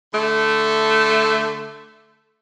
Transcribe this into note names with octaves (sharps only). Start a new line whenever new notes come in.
D3 A3